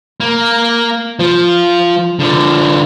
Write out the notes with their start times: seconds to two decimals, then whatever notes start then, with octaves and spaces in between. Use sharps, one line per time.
0.20 A#3
1.19 F3
2.19 D3 F3